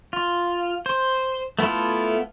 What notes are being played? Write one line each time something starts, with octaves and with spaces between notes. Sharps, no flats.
F4
C5
A3 B3 E4 F4 A4